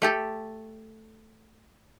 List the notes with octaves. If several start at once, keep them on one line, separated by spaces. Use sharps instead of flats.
A3 G4 A4